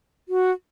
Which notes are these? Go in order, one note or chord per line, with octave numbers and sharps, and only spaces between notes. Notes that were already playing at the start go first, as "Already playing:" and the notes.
F#4